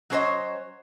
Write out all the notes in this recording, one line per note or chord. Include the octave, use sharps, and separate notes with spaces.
F#3 C#4 A4 C5 C#5 D#5